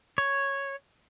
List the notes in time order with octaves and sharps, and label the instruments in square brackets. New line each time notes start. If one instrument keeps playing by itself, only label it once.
[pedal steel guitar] C#5